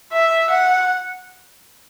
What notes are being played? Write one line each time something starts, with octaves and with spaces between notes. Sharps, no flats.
E5
F#5